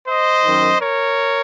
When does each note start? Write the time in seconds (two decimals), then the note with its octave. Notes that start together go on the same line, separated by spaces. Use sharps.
0.08 C5 D#5
0.45 F#2 D#3
0.81 A#4 C#5